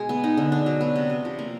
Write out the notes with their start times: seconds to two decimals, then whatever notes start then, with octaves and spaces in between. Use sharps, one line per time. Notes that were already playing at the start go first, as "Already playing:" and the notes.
Already playing: B2 G#3 G#4
0.09 B3
0.24 D#4
0.37 D3
0.52 D4
0.66 F#3
0.81 B3
0.96 C3
1.10 C3
1.25 F3
1.39 A#3